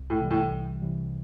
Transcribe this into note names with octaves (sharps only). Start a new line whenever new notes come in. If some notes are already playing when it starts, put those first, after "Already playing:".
Already playing: C2
A2
C3 E3 G3
A2
C2
C3 E3 G3